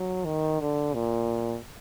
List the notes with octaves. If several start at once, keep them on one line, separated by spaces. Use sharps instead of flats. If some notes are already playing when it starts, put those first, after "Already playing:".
Already playing: F#3
D#3
D3
A#2